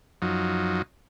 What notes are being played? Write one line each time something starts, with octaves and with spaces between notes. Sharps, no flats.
F#2 F3 F#3 D#4